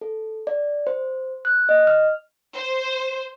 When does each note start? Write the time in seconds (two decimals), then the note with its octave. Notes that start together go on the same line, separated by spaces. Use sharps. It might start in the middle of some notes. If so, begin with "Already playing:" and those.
0.01 A4
0.47 D5
0.87 C5
1.45 F#6
1.69 D#5
1.87 F6
2.54 C5